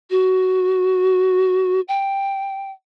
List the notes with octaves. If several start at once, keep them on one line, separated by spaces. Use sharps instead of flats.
F#4
G5